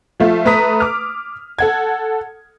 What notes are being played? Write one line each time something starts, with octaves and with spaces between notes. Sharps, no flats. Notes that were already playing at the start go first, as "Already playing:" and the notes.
F3 A3 F4
A3 B4 A#5 D#6 B6
D6 F6
A4 F#5 G#6